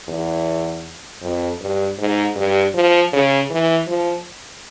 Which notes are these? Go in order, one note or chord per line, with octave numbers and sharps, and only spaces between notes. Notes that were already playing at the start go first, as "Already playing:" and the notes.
E2
F2
G2
G#2
G2
F3
C#3
E3
F3